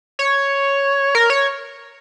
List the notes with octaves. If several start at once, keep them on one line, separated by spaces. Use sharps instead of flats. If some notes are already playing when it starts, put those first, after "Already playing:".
C#5
A#4
C#5